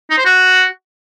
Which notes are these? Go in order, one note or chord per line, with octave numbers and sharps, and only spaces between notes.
D#4
C5
F#4